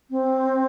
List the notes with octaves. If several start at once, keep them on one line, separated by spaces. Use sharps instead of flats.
C4